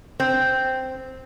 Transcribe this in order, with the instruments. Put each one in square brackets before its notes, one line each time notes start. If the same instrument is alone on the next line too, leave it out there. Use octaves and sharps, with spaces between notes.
[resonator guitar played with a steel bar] C4